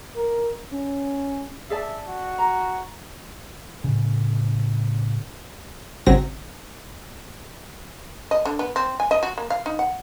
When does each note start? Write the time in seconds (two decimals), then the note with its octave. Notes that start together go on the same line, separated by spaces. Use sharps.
0.16 A#4
0.72 C#4
1.70 G#4 D5 E5 A5
2.08 F#4
2.38 A#5
3.84 A2 C#3
6.07 G#1 C#3 F#3 C4 A#6
8.31 D#5
8.45 D3
8.59 B3
8.76 C4
9.00 G#5
9.11 D#5
9.23 F#4
9.38 A#3
9.50 F5
9.66 D#4
9.79 F#5